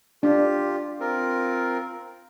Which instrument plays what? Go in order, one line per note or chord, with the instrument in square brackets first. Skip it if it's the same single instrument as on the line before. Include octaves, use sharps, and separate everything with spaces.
[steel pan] D4 [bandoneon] F4 G4
[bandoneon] C4 F4 A#4